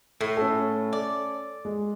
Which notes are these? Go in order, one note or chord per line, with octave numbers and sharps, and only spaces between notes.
A2
C#4 A4
D5
G#3